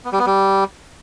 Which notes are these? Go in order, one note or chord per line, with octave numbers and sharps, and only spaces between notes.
B3
G3
B3
G3